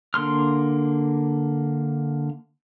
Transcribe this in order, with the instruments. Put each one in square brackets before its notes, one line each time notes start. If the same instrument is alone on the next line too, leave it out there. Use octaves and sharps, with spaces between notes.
[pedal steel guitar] D3 A#3 C6 F6